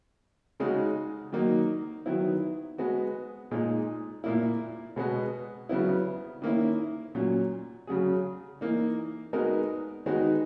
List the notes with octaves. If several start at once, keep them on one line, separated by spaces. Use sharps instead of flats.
C#3 G#3 D#4 F#4
D#3 F#3 A#3 D#4
D#3 F#3 B3 E4
G#3 B3 F#4
A#2 G#3 D#4
A#2 A#3 E4
B2 G#3 B3 F#4
C#3 F#3 B3 E4
D#3 A#3 C#4 E4
A#2 F#3 C#4
C#3 F#3 C#4 G#4
E3 A#3 D#4
G#3 B3 D#4 F#4 A#4
D#3 G#3 B3 D#4 F#4